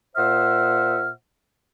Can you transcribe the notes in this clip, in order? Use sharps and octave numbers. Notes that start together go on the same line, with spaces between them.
A#2 C5 E5 F#5 F6